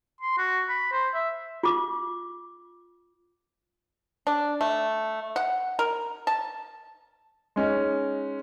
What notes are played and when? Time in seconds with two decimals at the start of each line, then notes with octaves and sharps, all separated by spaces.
0.21 C6
0.38 F#4
0.69 B5
0.92 C5
1.14 E5
1.63 F4 D6
4.27 D4
4.61 A3
5.36 F#5
5.79 A#4
6.27 A5
7.56 G#3 C#4 D#4